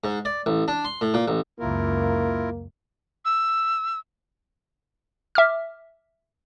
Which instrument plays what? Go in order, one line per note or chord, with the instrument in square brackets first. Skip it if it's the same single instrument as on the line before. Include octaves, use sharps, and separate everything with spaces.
[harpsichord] G#2
D5
A1
D4
C6
A2
A#2
A1
[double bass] C#2 F#2 [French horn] A#3 [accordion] E4 F4 A#4
[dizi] E6
[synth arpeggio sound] E5 D6 F6